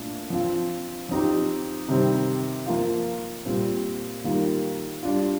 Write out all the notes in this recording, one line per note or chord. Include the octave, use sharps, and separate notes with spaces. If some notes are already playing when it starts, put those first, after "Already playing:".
Already playing: A#2 A3 D4
F3 C4 F4
F3 C4 D#4 G4
C3 D#3 G3 C4
F3 A#3 F4
A#2 G3 C4
D#3 G3 A#3 F4
G3 D4 F4